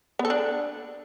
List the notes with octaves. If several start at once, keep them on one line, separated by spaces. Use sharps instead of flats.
B3
A4
D4